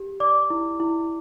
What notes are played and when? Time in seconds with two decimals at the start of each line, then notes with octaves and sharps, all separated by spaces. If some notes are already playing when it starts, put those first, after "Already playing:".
Already playing: G4
0.20 D5 D6
0.50 E4
0.80 E4